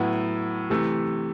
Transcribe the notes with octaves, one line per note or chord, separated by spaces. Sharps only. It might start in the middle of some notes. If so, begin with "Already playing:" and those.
Already playing: A2 F#3 B3 E4
C3 E3 A3